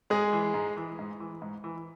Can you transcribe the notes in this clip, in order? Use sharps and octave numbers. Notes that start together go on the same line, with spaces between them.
G#2 G#3 G#4
E3
G#2
E3
G#2
E3
G#2
E3